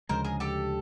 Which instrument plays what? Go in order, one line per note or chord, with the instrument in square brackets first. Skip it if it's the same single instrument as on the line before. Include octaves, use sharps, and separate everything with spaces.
[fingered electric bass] D2 C#3 F3 G#3 [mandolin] A#4 C5
[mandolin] G#4 A#4
G4 A4